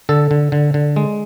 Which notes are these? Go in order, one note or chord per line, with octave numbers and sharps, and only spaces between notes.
D3 A4
D3
D3
D3
G#3